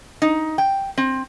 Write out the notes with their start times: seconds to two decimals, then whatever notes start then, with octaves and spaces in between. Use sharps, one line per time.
0.22 D#4
0.58 G5
0.98 C4